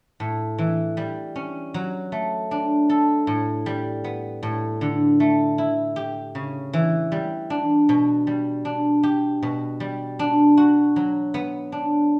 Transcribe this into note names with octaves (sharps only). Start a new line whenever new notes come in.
A2
E3
G3
C#4
F#3
A3
D4
A4
A2
G3
B3
A2
D3
A3
E4
G4
C#3
E3
G3
D4
B2
G3
D4
G4
B2
G3
D4
F#4
F#3
B3
D4